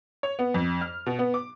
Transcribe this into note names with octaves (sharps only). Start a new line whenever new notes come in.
C#5
B3
F2
F6
B2
B3
D6